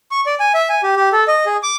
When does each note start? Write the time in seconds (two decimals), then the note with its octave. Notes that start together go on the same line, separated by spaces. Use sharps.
0.11 C#6
0.26 D5
0.40 G#5
0.54 E5
0.69 G#5
0.83 G4
0.96 G4
1.12 A4
1.28 D#5
1.46 G#4
1.63 D6